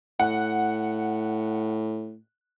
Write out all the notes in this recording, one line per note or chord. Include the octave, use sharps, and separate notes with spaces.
A2 F#5